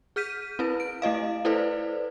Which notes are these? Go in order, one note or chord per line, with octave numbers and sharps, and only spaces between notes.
G#4 F6 G6 B6 D#7
C4 E4 B4
D7
A3 E4 D#5 F5
E4 A4 B4 C5 D5